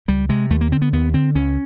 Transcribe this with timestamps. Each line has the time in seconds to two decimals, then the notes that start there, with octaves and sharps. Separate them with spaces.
0.08 C#2 G3
0.29 C3 G#3
0.50 D#2 A3
0.61 A#3
0.72 D3 C4
0.82 B3
0.93 D#2 B3
1.14 D3 C4
1.35 C#2 C#4